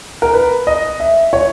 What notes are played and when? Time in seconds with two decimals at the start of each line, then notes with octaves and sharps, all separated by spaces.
0.22 A#4
0.33 B4
0.67 D#5
1.00 E5
1.33 C#5